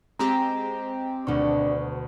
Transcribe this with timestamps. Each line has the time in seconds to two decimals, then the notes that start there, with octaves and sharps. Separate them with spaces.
0.19 G#3 C4 G4 A#5
1.27 D2 B2 D4 C#6